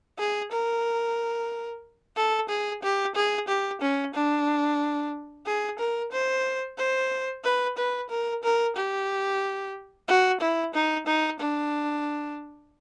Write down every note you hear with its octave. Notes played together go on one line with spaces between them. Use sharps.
G#4
A#4
A4
G#4
G4
G#4
G4
C#4
D4
G#4
A#4
C5
C5
B4
B4
A#4
A#4
G4
F#4
E4
D#4
D#4
D4